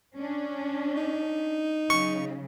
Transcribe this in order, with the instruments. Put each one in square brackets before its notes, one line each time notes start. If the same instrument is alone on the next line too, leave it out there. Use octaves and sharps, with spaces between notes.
[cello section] C#4 D4
[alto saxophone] D#4
[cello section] C#3 F#3 [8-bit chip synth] C#6